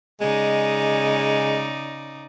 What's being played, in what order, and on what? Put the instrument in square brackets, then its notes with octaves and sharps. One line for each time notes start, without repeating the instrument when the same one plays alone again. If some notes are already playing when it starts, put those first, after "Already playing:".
[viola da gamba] C#3 D#4 D5 [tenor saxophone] G#3